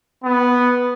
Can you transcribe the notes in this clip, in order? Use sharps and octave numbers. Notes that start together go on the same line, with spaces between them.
B3